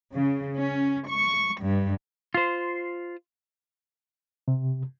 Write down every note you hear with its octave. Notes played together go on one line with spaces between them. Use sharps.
C#3
C#4
C#6
G2
F4 C5
C3